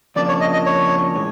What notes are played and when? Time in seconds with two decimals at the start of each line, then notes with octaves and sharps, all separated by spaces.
0.16 F2 C#3 F3 A#3 D4 D5
0.29 C#5
0.41 D#5
0.53 D#5
0.66 C#5
1.15 A2 E3 G#3